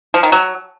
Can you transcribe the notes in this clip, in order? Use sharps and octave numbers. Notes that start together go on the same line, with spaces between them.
F3
D#3
F#3